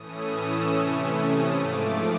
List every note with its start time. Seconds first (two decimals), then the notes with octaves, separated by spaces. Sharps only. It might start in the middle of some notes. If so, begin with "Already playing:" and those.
Already playing: A2 E3 A3 C#4 D#6
0.30 E6
0.70 C3 E3 A3 C#4
1.10 D#6
1.52 G#2 F3 A3 D6